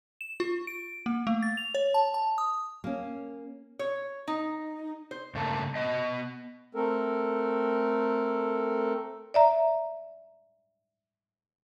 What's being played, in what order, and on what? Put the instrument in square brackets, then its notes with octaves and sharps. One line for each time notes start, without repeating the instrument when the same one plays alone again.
[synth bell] E7
F4
D7
A#3
A3
A6
F7
C#5
A5
A5
D#6
[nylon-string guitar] A#3 C#4
[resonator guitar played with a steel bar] C#5
D#4
C5
[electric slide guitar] G2 C#3 A3 A#3 A5
B3 D#5
[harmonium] A3 C4 A4 A#4
[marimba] D5 E5 A#5